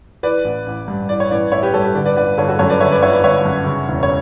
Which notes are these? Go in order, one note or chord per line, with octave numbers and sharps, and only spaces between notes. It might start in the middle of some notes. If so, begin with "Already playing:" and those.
E3 B4 D5
A1
A1
G2
E3 D5
C#5
A1 B4 D5
A1 C#5 E5
G4 B4
G2 A4 C#5
G4 B4
D3 B4 D5
B4 D5
G1 B4 D5
G1 A4 C#5
F#4 A4
F#2 A4 C#5
B4 D5
D3 C#5 E5
B4 D5
G1 C#5 E5
B4 D5
G1 C#5 E5
F#2
C#3
E1
C#5